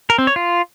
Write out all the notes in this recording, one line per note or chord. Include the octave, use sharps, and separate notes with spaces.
A#4
C4
C#5
F4